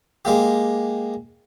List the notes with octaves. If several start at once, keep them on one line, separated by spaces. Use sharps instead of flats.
G#3 A#3 G4